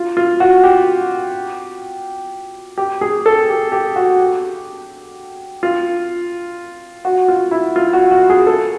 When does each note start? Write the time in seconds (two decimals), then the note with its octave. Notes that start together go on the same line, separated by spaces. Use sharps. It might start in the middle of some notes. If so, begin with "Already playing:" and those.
Already playing: F4
0.17 F4
0.40 F#4
0.64 G4
2.78 G4
3.01 G#4
3.26 A4
3.49 G4
3.72 G4
3.96 F#4
4.20 G4
5.63 F4
7.05 F#4
7.28 F4
7.51 E4
7.76 F4
7.93 F#4
8.11 F#4
8.30 G#4
8.47 A4